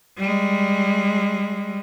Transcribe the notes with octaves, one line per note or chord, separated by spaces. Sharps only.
G3 G#3